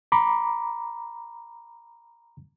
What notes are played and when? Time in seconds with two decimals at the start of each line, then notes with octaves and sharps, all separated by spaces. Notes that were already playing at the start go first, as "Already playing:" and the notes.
0.12 A#5 B5 D6